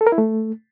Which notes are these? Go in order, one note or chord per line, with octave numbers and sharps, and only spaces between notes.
A4
A#4
E4
A3